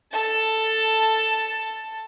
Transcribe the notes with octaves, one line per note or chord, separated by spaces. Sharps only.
A4 A5